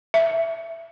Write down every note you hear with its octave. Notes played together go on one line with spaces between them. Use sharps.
E5